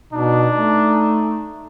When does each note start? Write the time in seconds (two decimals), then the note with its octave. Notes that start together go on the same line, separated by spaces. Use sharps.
0.13 B2 D4 D#4
0.55 A3